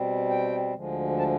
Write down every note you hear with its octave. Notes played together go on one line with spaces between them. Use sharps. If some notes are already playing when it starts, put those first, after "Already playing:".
Already playing: B2 G3 C4
G5
D2 D3 F3 G#3
A5